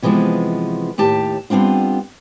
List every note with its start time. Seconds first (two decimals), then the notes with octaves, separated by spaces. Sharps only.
0.02 C3 E3 F3 G#3 B3
0.98 D#2 A2 G4 A5
1.50 G3 B3 C4 D4 F4